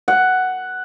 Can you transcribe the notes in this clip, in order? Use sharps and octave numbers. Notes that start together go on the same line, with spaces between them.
F#5